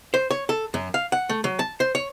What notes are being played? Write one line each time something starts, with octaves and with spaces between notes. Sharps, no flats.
C5
C#5
A4
F#2
F5
F#5
A3
F#3
A5
C5
C#5